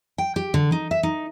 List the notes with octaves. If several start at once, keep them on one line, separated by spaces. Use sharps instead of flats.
G5
G4
D3
D#4
E5
D#4